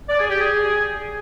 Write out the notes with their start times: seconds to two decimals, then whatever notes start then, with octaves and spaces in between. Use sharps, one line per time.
0.09 D5
0.20 G#4
0.30 G4
0.40 G#4